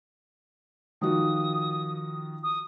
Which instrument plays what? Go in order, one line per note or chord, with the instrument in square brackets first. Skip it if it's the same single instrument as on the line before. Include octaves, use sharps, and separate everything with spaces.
[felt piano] D#3 F3 F#4 [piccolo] D#6
[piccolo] D#6